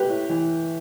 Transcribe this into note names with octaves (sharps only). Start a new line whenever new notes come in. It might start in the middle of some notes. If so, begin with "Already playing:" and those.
Already playing: G4 B4
A2
E3